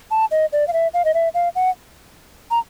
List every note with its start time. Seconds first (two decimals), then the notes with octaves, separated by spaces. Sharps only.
0.11 A5
0.31 D#5
0.53 D5
0.68 F5
0.73 E5
0.94 F5
1.05 D#5
1.14 E5
1.34 F5
1.55 F#5
2.51 A#5